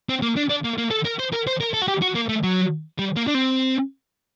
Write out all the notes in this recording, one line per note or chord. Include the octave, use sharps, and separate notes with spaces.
C4
A#3
D4
D4
A#3
A#3
A4
A#4
C5
A#4
C5
A#4
A4
F#4
G4
F#4
A#3
A3
F#3
G3
A#3
D4
C4